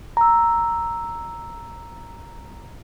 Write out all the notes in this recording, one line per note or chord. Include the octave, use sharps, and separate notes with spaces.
A#5 E6